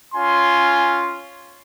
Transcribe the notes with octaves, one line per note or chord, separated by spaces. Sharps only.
C#4 F4 G#5 C6